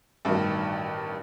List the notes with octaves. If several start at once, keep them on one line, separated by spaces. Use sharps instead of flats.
A1 G2 B2 D#3